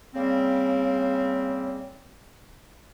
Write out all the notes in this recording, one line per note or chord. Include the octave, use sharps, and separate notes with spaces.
C#3 G3 A#3 C4